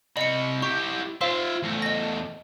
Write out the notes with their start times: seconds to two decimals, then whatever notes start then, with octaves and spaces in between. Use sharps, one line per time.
0.17 C3 D#5 B5 C#7
0.62 E4 G4 C#6
1.21 F4 C5 E5 F5 C6
1.63 E2 A3
1.82 D#5 A#6